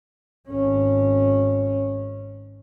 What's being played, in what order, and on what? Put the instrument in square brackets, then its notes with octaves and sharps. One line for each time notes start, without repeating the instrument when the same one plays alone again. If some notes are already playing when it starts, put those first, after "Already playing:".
[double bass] G#1 C#4